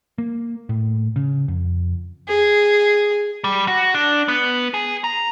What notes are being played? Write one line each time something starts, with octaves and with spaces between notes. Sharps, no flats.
A#3
A2
C#3
F2
G#4
G3
F#4
D4
B3
G#4
A#5